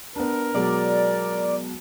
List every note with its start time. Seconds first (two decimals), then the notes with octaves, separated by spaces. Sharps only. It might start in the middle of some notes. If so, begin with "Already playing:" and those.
0.16 B3 D4 A#4
0.54 B2 F#3 G#3 D5